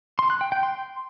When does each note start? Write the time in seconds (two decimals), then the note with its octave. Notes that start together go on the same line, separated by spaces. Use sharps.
0.19 C6
0.30 F#6
0.41 G5
0.52 G5
0.63 C6